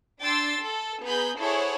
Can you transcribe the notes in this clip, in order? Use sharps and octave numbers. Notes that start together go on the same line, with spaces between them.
D4 G5 C6 E6 A6
A4
B3 G#4 A#5 B5 G6
E4 G#4 A4 C5 C#5 F#5